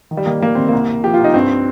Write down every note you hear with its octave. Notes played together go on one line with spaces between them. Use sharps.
D#3
G3
D#3 A#3
D#3 A#3
D#3 C4
C2 A#3
C2
F3 G4
C2 F4
D#4
G2 C4